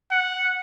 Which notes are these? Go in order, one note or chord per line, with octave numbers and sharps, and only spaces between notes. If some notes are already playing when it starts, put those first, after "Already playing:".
F#5